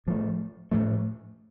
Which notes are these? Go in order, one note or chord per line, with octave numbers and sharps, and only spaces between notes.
A2 F3 A3
A2 F3 A3